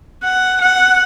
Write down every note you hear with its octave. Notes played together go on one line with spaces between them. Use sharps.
F#5
F#5